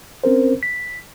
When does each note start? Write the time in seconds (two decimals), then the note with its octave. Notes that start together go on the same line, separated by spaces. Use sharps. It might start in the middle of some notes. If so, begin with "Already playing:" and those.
0.24 C4 C#4 A#4 C5
0.63 B6